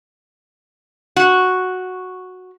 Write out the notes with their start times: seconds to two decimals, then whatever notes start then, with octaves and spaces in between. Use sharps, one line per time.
1.16 F#4